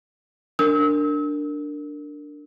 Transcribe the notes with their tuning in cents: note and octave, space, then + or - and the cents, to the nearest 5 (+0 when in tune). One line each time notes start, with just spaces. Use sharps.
D4 +0 A#4 -20 E6 -40